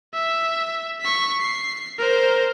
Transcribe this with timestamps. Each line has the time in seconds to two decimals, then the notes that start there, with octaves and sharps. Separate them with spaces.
0.14 E5
1.01 C#6 B6
1.41 C7
1.98 A#4 C5